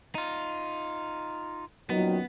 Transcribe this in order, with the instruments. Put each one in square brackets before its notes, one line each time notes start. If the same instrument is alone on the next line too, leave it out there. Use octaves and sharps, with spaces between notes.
[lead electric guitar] D#4 F4
[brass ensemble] F#2 A#2 D#3 [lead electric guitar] B3